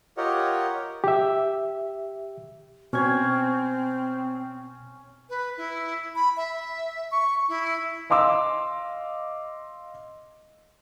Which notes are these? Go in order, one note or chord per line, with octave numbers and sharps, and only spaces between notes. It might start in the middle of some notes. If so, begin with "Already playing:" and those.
F4 G4 A#4 C#5 D#5 F#5
G4 E5
B2 C4 C#4 G#6
B4
E4
B5
E5
C#6
E4
D#5 F5 C6 D6 E6